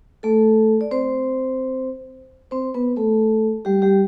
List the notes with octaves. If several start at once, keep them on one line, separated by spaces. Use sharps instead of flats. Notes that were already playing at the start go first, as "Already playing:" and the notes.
A3 A4
D5
C4 C5
C4 C5
B3 B4
A3 A4
G3 G4
G3 G4